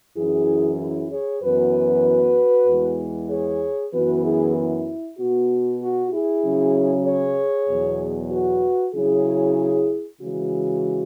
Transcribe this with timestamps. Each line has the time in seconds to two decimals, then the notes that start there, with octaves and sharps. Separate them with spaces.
0.17 F#2 E3 C#4 E4 G#4
0.79 E4 G#4
1.11 G#4 C#5
1.42 F#2 E3 B3 F#4 B4
2.67 E2 E3 G#3 B3
3.30 G#4 C#5
3.93 F#2 E3 B3 F#4 B4
4.24 E4 G#4
4.56 E4
5.19 B2 B3 F#4
5.81 F#4
6.12 E4 G#4
6.43 C#3 F#3 C#4
7.06 G#4 C#5
7.68 E2 B2 F#3
8.31 F#4 B4
8.94 C#3 F#3 C#4 E4 G#4
10.20 C#3 E3 G#3 F#4